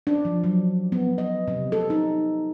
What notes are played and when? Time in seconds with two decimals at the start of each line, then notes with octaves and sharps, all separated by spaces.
0.07 D4
0.25 F3
0.44 F#3
0.92 B3
1.18 D#5
1.48 C3
1.72 A4
1.90 D#4